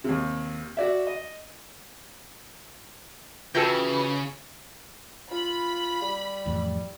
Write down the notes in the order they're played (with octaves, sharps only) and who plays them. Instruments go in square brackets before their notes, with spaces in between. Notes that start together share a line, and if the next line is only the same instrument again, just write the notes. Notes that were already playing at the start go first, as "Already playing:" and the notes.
[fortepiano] D#2 C3
F#4 D5 E5
D#5
[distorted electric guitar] C#3 [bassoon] E3 [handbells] F4 F#4 [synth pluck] A4 G5
[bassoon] F4 [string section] B5
[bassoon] G3
[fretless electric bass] F2 A2 E3